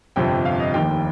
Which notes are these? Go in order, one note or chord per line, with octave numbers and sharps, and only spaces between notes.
G1 F2 C3 F3 G5
F5
D#5
F1 D#2 D#3 G5